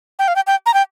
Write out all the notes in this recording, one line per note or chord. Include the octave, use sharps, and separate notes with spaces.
G5
F5
G5
G5
A#5
G5